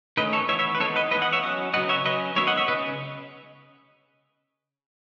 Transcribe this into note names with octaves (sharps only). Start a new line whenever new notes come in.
D#3 A3 C#4 B4 D#5
A4 C#5
E3 B3 C#5 E5
C#5 E5
B4
D#3 G#3 B3 A4 C#5
B4 D#5
E3 G#3 B3 B4 D#5
D#5 F#5
C#5 E5
F#3 C#4 D#5 F#5
C#3 F#3 B3 D#5 F#5
C#5 E5
F#3 C#4 B4 D#5
D#3 G#3 B3 C#5 E5
D#5 F#5
C#5 E5
C#3 B4 D#5